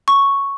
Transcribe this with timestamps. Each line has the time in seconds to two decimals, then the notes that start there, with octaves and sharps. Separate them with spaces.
0.08 C#6